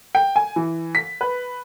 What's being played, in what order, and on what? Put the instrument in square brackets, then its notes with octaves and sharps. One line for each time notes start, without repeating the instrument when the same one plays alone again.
[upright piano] G5
G#5
E3
B6
B4